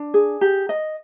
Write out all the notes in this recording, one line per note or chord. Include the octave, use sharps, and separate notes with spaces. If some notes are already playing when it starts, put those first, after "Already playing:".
Already playing: D4
G#4
G4
D#5